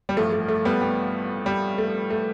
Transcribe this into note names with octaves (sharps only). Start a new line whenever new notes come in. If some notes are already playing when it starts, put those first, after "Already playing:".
G3
A1 G2 F3 A3
A3
A3
G3 B3
G3
G3
A3
A3